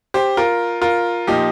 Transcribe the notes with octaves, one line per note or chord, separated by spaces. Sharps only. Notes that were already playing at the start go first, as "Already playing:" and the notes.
G4 C5
F4 A#4
F4 A#4
A#2 F3 D#4 G4